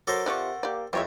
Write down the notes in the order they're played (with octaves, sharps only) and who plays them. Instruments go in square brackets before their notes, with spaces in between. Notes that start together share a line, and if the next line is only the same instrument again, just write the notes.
[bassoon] F#3 [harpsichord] A4 A#4 C5 [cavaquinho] D6
[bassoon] C3 [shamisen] F3 D5 [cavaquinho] F#5 C#6
[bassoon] A#3 [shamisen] G4 D5
[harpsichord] F2 [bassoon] E3 [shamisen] F3 G#3 [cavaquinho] G4 C#5 E5